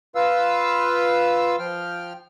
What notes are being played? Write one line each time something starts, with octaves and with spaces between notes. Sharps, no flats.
F4 B4 F5 E6
F3 G5 F6